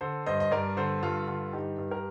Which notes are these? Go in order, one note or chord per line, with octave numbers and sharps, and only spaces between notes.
D3 A4 C5
G2 C5 D#5
D#5
G2 A#4 D5
D3 A4 C5
G2 F4 A4
D3 F4 A4
G2 D#4 G4
G2
G4 A#4